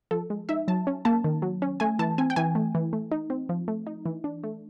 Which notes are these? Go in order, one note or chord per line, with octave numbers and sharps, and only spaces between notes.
F3 A4
G#3
D#4 E5
F#3 A5
C#4
A#3 A5
D#3
F#3
C#4
A3 G#5
E3 A5
C4 G#5
G5
E3 G#5
A3
E3
A3
D#4
C4
F3
A3
D#4
E3
D4
A3